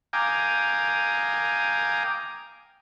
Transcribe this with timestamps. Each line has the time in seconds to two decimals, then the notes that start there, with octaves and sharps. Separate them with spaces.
0.13 F5 G5 G#5 A#5 D6 D#6